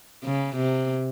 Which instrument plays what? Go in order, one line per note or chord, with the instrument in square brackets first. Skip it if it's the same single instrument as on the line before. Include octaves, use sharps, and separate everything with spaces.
[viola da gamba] C#3
C3